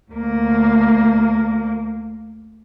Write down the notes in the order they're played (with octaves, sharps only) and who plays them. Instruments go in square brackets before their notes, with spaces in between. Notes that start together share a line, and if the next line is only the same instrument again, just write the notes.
[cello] D2 A#3